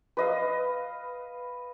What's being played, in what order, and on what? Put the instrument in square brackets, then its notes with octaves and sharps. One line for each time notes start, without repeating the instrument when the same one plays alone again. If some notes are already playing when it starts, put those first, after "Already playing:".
[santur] B4 D#5 F5